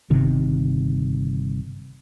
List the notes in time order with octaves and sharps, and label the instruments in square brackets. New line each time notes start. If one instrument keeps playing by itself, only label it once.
[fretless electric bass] G1 C3 D#3